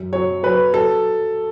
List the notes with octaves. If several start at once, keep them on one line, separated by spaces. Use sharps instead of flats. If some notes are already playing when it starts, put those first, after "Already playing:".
Already playing: F#2
F#3 C#5
F#3 B4
F#3 A4